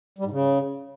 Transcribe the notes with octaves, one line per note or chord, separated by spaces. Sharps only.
G3
G#2
C#3